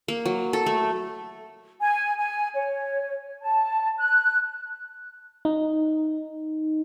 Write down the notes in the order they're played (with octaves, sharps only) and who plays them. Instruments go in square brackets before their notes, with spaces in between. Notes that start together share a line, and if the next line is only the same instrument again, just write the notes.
[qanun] A#3
F#3
A4
A3
[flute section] G#5
G#5
C#5
A5
F#6
[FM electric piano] D#4